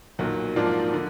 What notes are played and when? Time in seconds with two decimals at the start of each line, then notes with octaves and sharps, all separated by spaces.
0.19 B1 A#2 F#3
0.56 G#2 F3 A#3 D4 F4
0.94 D3